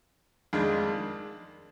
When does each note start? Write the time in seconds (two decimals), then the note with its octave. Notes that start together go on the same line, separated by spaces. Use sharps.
0.53 F2 D#3 G#3 D4 F4